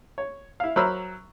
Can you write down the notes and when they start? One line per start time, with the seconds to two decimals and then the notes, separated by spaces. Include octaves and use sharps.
0.18 C#5
0.60 E4 F5
0.76 F#3 A#4 C5 B5 E6 F6